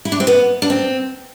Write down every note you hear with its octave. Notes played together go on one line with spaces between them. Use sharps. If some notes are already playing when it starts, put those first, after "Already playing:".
E4
D4
C4
B3
D4
C4